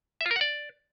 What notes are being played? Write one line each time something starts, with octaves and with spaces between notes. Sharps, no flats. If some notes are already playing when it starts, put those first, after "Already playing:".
E5
F4
A#4
F#5
D5